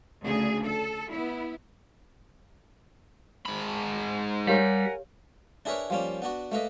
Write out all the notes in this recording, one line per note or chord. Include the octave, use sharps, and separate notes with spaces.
D2 C#3 D4 G#4
A4
B3 E4
G#2 B5
G3 G4 A#4 C#5 F5 F#5 G#5
D4 E4 G#4 A#4 B4 C#5
F3 G3 A#3 C#4
B3 D4 F#4
A3 A#3 B4 D#5